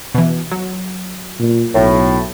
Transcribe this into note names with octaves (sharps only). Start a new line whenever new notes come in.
B2 E3
F#3
A#2
B1 A2